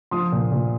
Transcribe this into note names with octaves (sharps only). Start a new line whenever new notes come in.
F3 C6 D#6
A#2
A#2